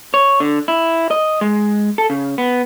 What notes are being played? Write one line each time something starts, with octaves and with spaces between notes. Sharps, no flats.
C#5
D3
E4
D#5
G#3
A4
C#3
B3